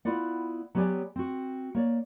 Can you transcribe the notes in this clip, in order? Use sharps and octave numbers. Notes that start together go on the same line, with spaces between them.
B3 E4 F4 D5 F#5
F#3 B3 G4 C#5 D5 G#5
C4 F#4
A#3 C#5 D5